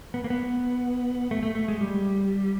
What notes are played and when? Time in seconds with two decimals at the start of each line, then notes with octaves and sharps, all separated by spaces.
0.14 B3
0.24 A#3
0.30 B3
1.31 A3
1.43 A3
1.55 A3
1.68 G#3
1.81 G3